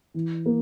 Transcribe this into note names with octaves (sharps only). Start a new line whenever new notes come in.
E3
A#3